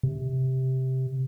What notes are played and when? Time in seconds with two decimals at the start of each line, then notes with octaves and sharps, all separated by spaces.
0.03 C3